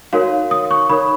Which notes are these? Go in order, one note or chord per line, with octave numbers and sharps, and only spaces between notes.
D#4 F#4 A#4 C#5 F5
D#6
C#6
D#4 A#4 C#5 B5